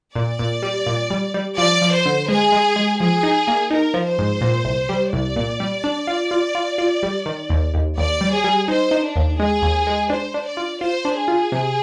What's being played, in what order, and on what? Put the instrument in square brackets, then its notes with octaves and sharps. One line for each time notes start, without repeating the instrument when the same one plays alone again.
[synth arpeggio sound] A#2 [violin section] D5
[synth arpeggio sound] A#2
G3
A#2
G3
G3
[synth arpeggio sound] F3 [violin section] D5
[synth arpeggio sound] F3
[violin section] C5
[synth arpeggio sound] D3
[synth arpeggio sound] G#3 [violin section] G#4
[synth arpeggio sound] G#3
G#3
[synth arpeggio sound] F3 [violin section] G#4
[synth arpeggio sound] D#4
A#3
[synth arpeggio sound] D#4 [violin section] A#4
[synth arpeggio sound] F3
[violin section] C5
[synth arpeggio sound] G#2
A#2
C2
G3
[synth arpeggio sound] C2 [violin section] D5
[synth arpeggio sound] A#2
G3
D4
F4
F4
F4
F4
G3
D#3
D#2
D#2
[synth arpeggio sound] D#2 [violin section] D5
[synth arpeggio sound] G3
[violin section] G#4
[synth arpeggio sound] G3
[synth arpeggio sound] D#4 [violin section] C5
[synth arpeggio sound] D#4
[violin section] D4
[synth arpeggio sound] D#2
[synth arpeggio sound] G#3 [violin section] G#4
[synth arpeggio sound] D#2
G#3
[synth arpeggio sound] D4 [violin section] C5
[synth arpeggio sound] D4
[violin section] D5
[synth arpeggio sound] F4
[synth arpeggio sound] F4 [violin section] C5
[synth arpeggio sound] D4
[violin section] G#4
[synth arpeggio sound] F4
C3